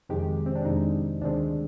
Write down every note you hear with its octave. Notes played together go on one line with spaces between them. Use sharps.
F2 C3 D#3 G#3 G4
C4
D4
F2 C3 D#3 G#3 D#4
D2 C3 D#3 G#3 C4 D4